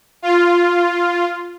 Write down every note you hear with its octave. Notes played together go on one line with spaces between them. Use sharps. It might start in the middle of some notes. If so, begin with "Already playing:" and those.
F4